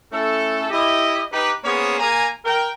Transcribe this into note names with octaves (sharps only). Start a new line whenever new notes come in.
A3 C#4 E4 A4
E4 G4 D#5
D#4 G4 B4
A#3 B3 C#4 G#4 C5 C#5
A#3 G#5 A#5
A#4 G5